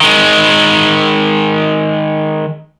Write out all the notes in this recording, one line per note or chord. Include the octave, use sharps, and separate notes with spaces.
D#3 G#3